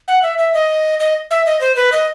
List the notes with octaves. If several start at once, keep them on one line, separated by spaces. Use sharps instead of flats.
F#5
E5
E5
D#5
D#5
E5
D#5
C5
B4
D#5